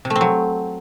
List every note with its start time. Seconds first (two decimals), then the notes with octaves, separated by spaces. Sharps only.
0.05 C3
0.10 A3
0.16 C4
0.21 F#3